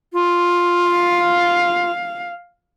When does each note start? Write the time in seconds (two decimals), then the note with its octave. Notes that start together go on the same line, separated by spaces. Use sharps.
0.13 F4
0.90 F5